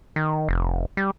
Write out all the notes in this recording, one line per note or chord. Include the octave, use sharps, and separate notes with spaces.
D#3
F1
G3